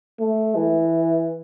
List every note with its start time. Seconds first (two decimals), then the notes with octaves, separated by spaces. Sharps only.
0.20 A3
0.56 E3